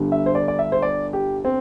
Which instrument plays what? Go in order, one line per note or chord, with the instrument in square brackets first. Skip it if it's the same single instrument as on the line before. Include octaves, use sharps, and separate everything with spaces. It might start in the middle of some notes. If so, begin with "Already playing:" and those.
Already playing: [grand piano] G1 G2 D3 G3
E5
C5
D5
D5
E5
C5
D5
G4
C4